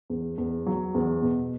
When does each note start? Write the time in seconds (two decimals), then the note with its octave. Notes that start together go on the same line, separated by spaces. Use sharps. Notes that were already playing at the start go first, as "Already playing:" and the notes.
0.10 E2
0.38 E2
0.66 F#3
0.94 E2
1.22 B2